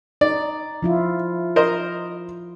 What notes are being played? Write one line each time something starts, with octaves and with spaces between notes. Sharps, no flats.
D#4 D5
F3 E4 F4
A#4 C5 D#5